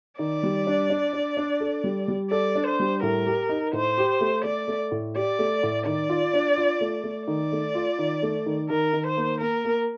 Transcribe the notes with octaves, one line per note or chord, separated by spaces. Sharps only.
D#3 D5
G3
D4
D4
D4
D4
A4
G3
G3
A4 D5
D4
C5
G3
A2 A#4
G4
D#4
A2 C5
G4
A3
A3 D5
A3
A2
G4 D5
A3
A2
D#3 D5
F4
D4
F4
A3
A3
D#3 D5
A3
F4
D#3
A3
D#3
D#3 A#4
D#3
C5
A#3
A#3 A#4
A#3